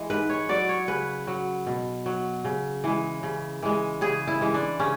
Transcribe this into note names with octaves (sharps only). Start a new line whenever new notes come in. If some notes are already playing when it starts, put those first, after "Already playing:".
Already playing: E3 G#3
G#2 B4
C#5
F#3 D5
C#5
C#3 B4
F#3
B2
F#3
C#3
E3 G#3
C#3
E3 G#3
C#3 G#4
E4
E3 G#3
D4
C#3 C#4